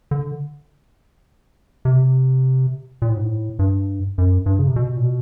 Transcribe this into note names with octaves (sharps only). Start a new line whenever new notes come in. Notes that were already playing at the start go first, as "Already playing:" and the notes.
D3
C3
A#2
A2
G#2
A2
G2
F#2
G2
C#3
C3
B2
A#2
B2